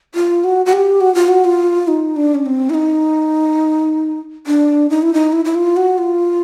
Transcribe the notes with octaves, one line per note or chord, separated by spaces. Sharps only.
F4
F#4
F#4
G4
F#4
F4
F#4
F4
D#4
D4
C#4
C4
E4
D#4
D4
D#4
E4
D#4
E4
E4
F4
F#4
F4